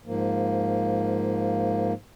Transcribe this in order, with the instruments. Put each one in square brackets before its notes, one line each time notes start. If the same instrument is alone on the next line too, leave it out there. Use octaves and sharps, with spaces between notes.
[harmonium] G#2 F3 A#3